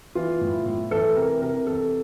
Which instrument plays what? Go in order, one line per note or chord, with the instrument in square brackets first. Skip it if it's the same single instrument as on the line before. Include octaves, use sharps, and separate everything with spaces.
[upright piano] E3 F4
A2
A2
E3 A4
C3 A#4
C3 A#4
E3 A4